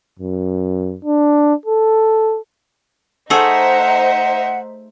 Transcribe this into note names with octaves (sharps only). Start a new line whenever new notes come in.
F#2
D4
A4
A3 D#4 G#4 A4 C5 E5 F#5